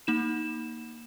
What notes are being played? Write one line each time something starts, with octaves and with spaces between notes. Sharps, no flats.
A#3 D#4 E7